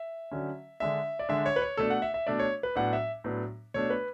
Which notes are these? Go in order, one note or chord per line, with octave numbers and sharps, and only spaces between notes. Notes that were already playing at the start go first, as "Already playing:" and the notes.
Already playing: E5
D3 F#3 C#4
D3 G#3 D4 E5
D5
D3 G#3 D4 E5
C#5
B4
C#5
B2 A3 D4 A4
F#5
E5
E5
B2 A3 D4 D5
C#5
B4
A2 F#3 B3 D4 F#5
E5
A2 F#3 B3 D4
B2 A3 D4 C#5
B4